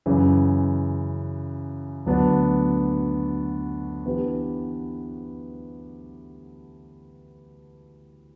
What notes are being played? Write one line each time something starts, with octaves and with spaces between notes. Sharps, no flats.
F#2 C#3 E3
D2 D3 F#3 B3 D4
E3 B3 D4 G4 B4